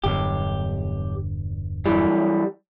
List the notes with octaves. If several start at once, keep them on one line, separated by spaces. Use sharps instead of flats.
E1 B1 G2 D3 G4
F#2 E3 G3